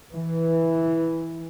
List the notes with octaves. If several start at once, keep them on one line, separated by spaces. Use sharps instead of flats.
E3